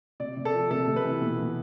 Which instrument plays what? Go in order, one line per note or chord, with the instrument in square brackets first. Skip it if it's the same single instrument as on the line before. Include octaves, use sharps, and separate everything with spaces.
[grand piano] C3 D5
C3
A4
F3
C3 A4
C3
B4
E3
B2
B2